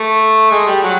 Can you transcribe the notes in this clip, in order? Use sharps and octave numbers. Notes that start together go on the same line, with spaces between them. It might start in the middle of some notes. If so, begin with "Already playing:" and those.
Already playing: A3
G#3
G3
F#3